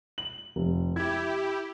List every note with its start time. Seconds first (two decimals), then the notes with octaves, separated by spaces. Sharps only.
0.18 F#7
0.56 F1
0.96 E4 G4 G#6